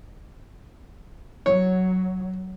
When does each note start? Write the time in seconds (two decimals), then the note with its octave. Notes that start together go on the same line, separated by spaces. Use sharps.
1.46 F#3 C#5